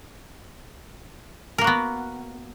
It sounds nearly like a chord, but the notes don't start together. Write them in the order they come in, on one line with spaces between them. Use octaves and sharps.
A#4 A#3 F#4 B3